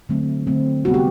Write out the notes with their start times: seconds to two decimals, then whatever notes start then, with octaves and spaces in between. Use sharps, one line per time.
0.09 D3 F#3 A3 C4
0.47 D3 F#3 A3 C4
0.84 C3 G3 B3 F#4
0.94 G4